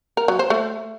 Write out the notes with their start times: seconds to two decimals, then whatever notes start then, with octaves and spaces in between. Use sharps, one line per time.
0.17 A#4
0.28 F#3
0.39 C5
0.50 A3